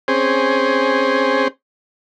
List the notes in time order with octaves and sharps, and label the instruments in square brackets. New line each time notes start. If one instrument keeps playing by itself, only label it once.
[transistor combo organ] C4 C#4 G#4 C5